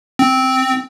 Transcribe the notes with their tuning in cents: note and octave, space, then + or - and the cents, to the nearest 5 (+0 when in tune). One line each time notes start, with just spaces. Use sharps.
C4 -5